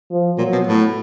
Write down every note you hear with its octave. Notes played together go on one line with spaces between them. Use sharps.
F3
A#2 F#3
B2
A2